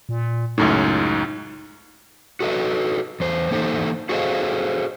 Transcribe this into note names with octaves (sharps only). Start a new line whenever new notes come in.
A#2
C#2 F#2 A2 D#4
F#4 A4 B4 D#5
E2 C5
E3 A#3 D#4 A4 C5
F#4 G#4 A4 C5 D#5 F5